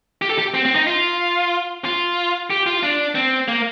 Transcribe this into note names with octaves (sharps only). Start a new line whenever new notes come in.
G4
A4
G4
C4
C4
D#4
F4
F4
G4
F4
D4
C4
A#3